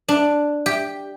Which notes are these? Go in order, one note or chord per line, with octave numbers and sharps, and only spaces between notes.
D4
G4